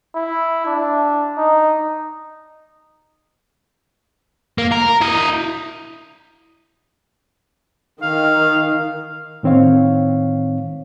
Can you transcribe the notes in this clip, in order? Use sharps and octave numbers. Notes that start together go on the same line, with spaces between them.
E4
D4
D#4
A#3
A#4
E4 D#5
D#3 F5
A2 D#3 C4 C#5 F5